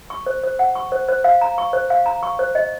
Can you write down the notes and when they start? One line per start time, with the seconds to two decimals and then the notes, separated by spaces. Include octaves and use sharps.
0.10 C#6
0.26 C5
0.43 C5
0.59 F#5
0.75 C#6
0.92 C5
1.08 C5
1.24 F5
1.41 A#5
1.58 C#6
1.73 C5
1.90 F5
2.06 A#5
2.23 C#6
2.39 C5
2.55 D#5